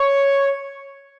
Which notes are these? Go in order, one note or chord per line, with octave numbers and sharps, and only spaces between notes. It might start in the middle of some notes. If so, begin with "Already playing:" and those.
Already playing: C#5